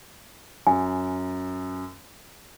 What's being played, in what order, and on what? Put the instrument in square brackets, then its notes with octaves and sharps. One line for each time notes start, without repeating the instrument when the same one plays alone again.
[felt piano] F#2 [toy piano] G#5